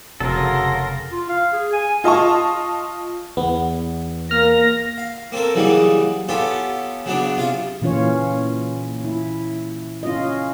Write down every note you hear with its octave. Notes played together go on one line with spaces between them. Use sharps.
F1 C#3 F#3 A4 A#4 C6 A#6
F4
F5
G#4
G#5
F4 D#5 A5 C#6
E2 B3
A#3 F6 A#6
F5
A#3 C4 A4 A#4
C#3 E3 F#3 G3 A#3 D#4
B3 C#4 F4 G4 A4
C#3 F#3 B3 D4
C3 F4 F5
A#2 E3 C#4 F4 C#5
E4
C#4 F4 D#5